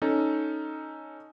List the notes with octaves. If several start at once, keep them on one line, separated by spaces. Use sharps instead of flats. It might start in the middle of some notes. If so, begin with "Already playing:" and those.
C#4 D#4 A4